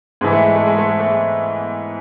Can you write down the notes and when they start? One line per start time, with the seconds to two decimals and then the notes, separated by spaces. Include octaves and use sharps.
0.21 G#2 E3 G#3
0.32 A3
0.44 G#3
0.55 A3
0.66 G#3
0.78 A3
0.89 G#3
1.00 A3
1.11 G#3